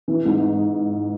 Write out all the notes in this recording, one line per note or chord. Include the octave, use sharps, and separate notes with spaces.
E3
G#2